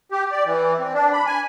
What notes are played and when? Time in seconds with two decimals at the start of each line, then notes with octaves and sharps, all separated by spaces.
0.12 G4
0.32 D5
0.45 E3
0.79 C4
0.94 D4
1.13 B5
1.26 G#5